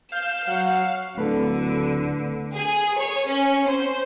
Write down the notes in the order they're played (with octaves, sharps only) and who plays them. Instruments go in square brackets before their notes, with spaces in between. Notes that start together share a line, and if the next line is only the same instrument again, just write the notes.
[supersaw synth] F5 [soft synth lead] G6 [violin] E7
[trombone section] F#3 [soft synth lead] F#5
[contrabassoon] D1 [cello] D3 [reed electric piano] A3 [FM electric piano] A4 B4 B5
[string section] G#4
C#5
C#4
C5